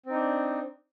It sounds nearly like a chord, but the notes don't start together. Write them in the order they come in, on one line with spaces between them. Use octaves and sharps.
C4 D#4 D4